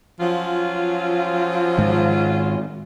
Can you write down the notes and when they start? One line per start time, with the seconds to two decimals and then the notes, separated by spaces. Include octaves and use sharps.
0.20 F3 F#3 C#4 F4
1.78 G#2 D#3